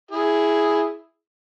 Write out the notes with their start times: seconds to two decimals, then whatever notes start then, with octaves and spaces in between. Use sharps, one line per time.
0.11 E4 G#4